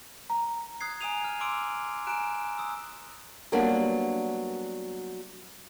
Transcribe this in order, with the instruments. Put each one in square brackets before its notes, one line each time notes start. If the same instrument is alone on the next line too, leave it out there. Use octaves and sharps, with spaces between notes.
[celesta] A#5
[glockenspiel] D#6 F#6 G#6 C7
G#5 A#5 D#6 D#7 F7
F6 G#6
C6 D6 E6 D7
G#5 A#5 F#6 D7 E7
D#6 E6
[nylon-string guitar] F#3 G3 A#3 B3 D4 G4